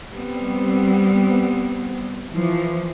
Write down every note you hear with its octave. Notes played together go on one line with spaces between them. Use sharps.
G3 B3 C4
E3 F3